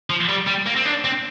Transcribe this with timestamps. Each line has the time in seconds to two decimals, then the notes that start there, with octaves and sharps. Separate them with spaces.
0.10 F3
0.29 G3
0.47 G3
0.66 A#3
0.76 C4
0.85 D4
1.04 C4